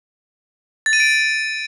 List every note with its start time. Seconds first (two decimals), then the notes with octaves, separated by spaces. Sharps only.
0.86 A6
0.93 D#7
1.00 D7
1.07 D#7